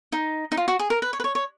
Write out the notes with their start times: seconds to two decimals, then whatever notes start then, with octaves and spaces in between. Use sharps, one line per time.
0.12 D#4
0.52 D#4
0.57 F4
0.68 F#4
0.79 G#4
0.90 A#4
1.02 B4
1.13 C#5
1.20 B4
1.24 C#5
1.35 C#5